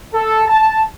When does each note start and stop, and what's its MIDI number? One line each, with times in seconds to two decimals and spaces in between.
0.14 0.41 69
0.47 0.80 81